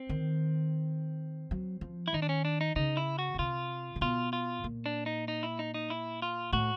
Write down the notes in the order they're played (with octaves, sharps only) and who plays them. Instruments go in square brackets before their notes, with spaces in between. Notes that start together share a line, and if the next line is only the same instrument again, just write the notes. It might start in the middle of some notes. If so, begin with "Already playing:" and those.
Already playing: [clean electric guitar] C4
[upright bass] D#3
F#3
F3
[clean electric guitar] E4
[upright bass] D#3 [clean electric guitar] D#4
[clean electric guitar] D4
C#4
D4
D#4
[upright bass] C#3 [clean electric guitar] D#4
[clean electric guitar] E4
F#4
[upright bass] C#3
[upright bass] C3 [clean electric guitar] F4
[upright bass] C3
[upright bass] B2 [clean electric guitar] F4
[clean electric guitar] F4
[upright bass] A#2
[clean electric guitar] D4
D#4
D#4
E4
D#4
D#4
E4
F4
[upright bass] A2 [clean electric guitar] F#4